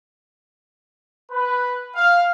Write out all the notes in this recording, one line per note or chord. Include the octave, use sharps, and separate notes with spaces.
B4
F5